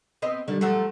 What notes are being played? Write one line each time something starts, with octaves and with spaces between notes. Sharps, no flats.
B3 C4 D#5
D3 D#3 G3
F3 F#3 A3